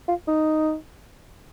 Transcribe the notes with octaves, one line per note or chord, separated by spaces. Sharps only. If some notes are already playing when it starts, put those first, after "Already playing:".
F4
D#4